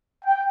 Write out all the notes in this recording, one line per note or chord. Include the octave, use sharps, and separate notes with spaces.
G5